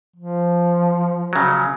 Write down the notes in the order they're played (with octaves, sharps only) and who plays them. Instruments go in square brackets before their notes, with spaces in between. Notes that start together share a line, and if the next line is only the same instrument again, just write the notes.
[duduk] F3
[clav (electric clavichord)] C#3 F#3